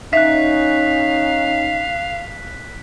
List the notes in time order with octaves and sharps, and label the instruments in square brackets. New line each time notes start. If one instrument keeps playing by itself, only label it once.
[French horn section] C#4 D#4 [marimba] E5 [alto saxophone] F5 [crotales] F#6 B6